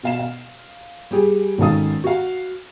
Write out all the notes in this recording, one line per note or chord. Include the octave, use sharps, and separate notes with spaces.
B2 F5 E7
F5
G3 G4 G#4
G#1 D#3 C#4 A4 F5 D#6
F#4 F5